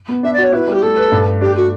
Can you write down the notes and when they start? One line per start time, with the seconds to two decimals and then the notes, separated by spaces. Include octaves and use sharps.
0.09 B3
0.23 D4 E5
0.33 D5
0.38 F#4 C#5
0.52 E4 B4
0.67 G3 G4
0.82 A3 A4
0.97 B4
1.12 G2
1.27 A3
1.41 D4 G4
1.56 A3 F#4